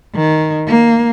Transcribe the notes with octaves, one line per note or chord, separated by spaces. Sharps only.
D#3
A#3